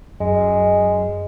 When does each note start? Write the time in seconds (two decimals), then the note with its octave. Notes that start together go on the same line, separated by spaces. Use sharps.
0.20 F#2 G#3